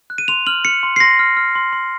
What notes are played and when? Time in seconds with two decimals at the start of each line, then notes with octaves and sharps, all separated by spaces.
0.10 F#6
0.18 D#7
0.28 C6 F7
0.47 F6 F#7
0.65 F6 C#7
0.83 C6
0.96 C7
1.00 C6 A#6
1.19 F6
1.37 F6
1.55 C6
1.73 C6